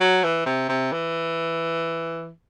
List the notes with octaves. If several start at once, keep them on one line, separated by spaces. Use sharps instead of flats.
F#3
E3
C3
C3
E3